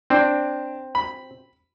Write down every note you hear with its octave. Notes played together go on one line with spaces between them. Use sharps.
C4 D4
B5